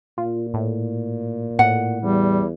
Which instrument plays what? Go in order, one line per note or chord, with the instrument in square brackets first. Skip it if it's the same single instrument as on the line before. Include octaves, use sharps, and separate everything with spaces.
[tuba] A#2 [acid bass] F4
[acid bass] A2
[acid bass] A2 [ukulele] F#5
[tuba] E2 [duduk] G3